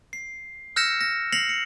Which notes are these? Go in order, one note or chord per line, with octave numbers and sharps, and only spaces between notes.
C7
E6 F6 G6 A#6 C#7 E7
A#6
A#6 C7 C#7 F7 F#7
C#7